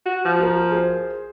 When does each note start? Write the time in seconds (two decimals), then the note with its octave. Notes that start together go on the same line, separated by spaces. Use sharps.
0.06 F#4
0.25 F3
0.39 F#4 A#4
0.71 G#4 C5